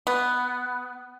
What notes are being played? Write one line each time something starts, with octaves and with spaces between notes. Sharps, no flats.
B3